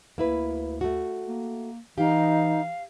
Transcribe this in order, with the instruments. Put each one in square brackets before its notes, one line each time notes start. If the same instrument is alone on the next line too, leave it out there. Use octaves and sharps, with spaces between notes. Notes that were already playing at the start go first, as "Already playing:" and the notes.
[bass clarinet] D2 [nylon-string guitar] A#3 E4 B4
[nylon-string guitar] A3 F#4
[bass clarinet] A#3
[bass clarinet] E3 [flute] D#4 [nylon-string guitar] G4 [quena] F5